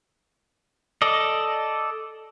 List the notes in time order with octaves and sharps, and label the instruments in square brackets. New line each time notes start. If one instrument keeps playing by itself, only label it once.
[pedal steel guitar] A4 D5 D#5